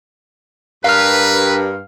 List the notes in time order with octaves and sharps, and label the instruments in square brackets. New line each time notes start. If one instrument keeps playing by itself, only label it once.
[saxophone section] G2 [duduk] A#4 [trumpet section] B4 [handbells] F5 F6